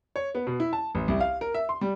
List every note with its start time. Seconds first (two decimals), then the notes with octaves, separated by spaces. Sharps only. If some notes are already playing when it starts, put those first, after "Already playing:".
0.16 C#5
0.35 B3
0.47 B2
0.60 E4
0.73 A5
0.95 A1
1.08 C2
1.21 F5
1.41 A#4
1.54 E5
1.69 C6
1.81 G3